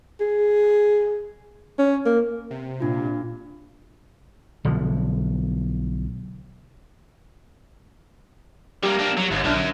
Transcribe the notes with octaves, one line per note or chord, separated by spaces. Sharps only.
G#4
C#4
A#3
C3
A#2 D4 F4
B1 D3 F3
G3 A#3 G4
A#3 D4
F#3
G1 D#2 G#2
B1 F#2 F#3 D4 F6
D3